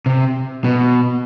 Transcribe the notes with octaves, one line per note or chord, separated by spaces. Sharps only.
C3
B2